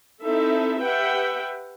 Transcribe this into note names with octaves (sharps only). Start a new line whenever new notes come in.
C4 D#4 E4 A4 E5
G4 B4 E5 F#5 G5